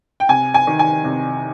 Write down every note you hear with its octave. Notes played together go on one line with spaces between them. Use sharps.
G5
C3 G#5
G#5
D#3
G#5
C3